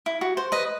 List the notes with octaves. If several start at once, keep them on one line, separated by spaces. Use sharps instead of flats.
E4
F#4
C5
B4 D#5